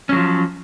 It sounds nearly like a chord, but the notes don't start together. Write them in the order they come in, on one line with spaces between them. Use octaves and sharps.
C#4 F#3 F3